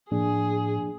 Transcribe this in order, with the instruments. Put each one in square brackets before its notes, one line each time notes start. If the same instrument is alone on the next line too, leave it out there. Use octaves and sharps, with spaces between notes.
[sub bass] A2 [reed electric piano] F3 A#3 D4 [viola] G#4